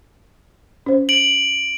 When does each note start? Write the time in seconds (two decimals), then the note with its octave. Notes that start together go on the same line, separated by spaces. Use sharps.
0.86 C#4 C5
1.09 D7 F#7